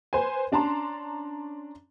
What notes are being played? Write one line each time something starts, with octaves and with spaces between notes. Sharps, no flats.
B4 C5 G#5
C#4 D4 A5 A#5 C6